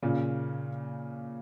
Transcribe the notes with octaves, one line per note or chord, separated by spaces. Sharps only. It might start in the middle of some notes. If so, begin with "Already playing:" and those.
A#2 C#3